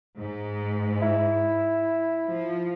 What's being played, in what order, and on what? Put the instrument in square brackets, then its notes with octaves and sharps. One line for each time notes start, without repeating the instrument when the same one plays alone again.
[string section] G#2
[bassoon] E4
[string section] F3